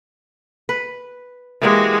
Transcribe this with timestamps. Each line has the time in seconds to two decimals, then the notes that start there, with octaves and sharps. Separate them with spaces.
0.69 B4
1.62 E3 G#3 A#3 F#4 G4